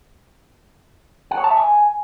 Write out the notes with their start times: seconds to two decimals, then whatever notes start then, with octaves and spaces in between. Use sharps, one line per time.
1.31 F#5
1.37 C#5
1.44 A5
1.50 E5
1.57 G#5